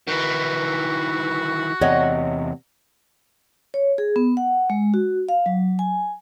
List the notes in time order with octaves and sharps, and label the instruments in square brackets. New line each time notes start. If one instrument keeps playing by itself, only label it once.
[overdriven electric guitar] D#3 E3 [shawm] F#4
[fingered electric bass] E2 C3 [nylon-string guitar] C#5 D#5 F#5
[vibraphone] C#5
G#4
B3
F#5
G#3
F#4
F5
F#3
G#5